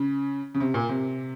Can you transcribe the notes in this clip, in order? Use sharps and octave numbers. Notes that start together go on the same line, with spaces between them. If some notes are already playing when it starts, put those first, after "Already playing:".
Already playing: C#3
C#3
C3
A#2
C3